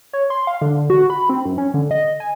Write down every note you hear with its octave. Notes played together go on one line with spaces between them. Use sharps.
C#5
C6
F5
D3
F#4
B5
C4
F#2
C#4
D3
D#5
G#5